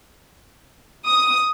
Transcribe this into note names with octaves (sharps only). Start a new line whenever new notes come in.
D#6